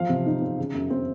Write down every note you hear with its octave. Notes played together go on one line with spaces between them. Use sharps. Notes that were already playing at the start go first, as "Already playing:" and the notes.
Already playing: F3 F5
C3
D#4
C4
C#3
F#2
C4